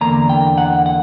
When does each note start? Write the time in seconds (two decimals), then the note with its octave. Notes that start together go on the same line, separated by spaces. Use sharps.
0.01 E2 D3 A#3 D4 A#5
0.29 G5
0.58 F#5
0.86 F#5